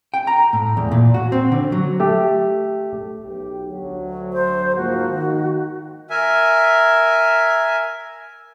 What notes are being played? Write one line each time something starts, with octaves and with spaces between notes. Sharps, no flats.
G5
A#5
A2
E2
A#2
F#4
C4
D3
F#3
A3 G4
B1 G4
D2 F#3
C5
G#2 F3 A#3 F#4
D#3
A#4 E5 G#5